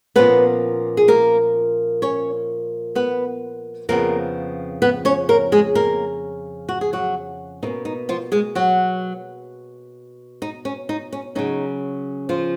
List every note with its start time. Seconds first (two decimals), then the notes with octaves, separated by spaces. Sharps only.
0.16 A#2 F3 A#3 B3 C#4 B4
0.97 G#4
1.08 A#3 A#4
2.02 C#4 C#5
2.95 B3 B4
3.89 F2 C#3 F3 A#3 B3 A#4
4.82 B3 B4
5.05 C#4 C#5
5.29 A#3 A#4
5.52 G#3 G#4
5.75 A#3 A#4
6.69 F#4
6.81 G#4
6.93 F#3 F#4
7.63 B2 A#3 C#4 D#4
7.85 D#4
8.09 F3 F4
8.32 G#3 G#4
8.55 F#3 F#4
10.42 D#4
10.65 C#4
10.89 D#4
11.13 C#4
11.35 C#3 F#3 C#4 D#4
12.29 F3 F4